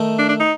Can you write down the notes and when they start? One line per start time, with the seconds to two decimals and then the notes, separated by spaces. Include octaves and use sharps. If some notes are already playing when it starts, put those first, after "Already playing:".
Already playing: D#3 A3 D#4
0.19 D4
0.29 D4
0.40 D#4